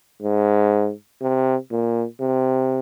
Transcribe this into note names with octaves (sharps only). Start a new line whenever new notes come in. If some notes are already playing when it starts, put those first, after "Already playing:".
G#2
C3
A#2
C3